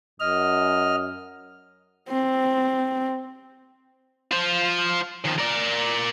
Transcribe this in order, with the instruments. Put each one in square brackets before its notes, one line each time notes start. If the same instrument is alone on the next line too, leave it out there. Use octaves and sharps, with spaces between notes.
[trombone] F#2 [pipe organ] D#5 F6
[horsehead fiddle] C4
[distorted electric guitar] F4 C5
D#3 F3
A#4 D5